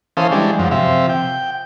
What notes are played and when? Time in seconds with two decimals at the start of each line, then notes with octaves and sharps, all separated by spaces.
0.17 E3 C#4 A4 C5 F5 D#6
0.32 E3 G3 G#3 D4
0.59 F#2 F3
0.71 C3 F3 E5
1.09 G5